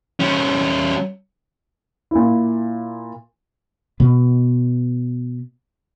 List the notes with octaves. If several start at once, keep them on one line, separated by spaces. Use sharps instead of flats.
G3 C#4
A#2 E4
B2 B3